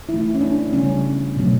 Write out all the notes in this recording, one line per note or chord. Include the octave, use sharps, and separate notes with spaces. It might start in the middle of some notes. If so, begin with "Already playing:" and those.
E3 A3 E4
C#4
D4
C#3 G3 B3 C#4
B2 F#3 A3